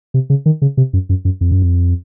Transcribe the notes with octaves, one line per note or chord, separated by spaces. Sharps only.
C3
C#3
D#3
C#3
C3
F#2
F#2
F#2
F2
F#2
F2